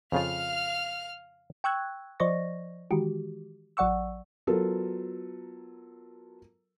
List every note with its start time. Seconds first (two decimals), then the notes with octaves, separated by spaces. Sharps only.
0.12 F2 C#3 F4 F5 F6
1.64 G5 C#6 E6 F#6 G#6
2.20 F3 C5 D5 D#5 C#6 A#6
2.91 D#3 E3 G#3 F#4 G4
3.77 A1 F#3 D5 F#5 C#6 E6
4.47 F#3 B3 F4 A4 A#4